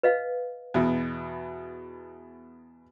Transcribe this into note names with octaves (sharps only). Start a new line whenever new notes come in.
B4 D#5 F5
E2 B2